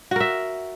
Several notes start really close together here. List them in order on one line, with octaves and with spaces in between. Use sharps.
F#4 A#4 E5